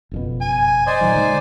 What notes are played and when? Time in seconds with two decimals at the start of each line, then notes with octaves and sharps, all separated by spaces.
0.11 F#1 F2 B2
0.41 G#5
0.86 C5 D5 D#5 G#5
1.01 A#2 D#3 F#3 D#4
1.16 D3 G#3 A#3